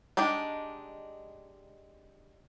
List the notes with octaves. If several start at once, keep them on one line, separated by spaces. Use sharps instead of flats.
G#3 D4 D#4 G4